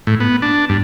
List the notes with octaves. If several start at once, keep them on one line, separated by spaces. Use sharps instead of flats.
A2
B3
D4
G2